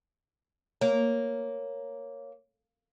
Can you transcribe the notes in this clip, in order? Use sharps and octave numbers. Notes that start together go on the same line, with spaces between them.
A#3 C#5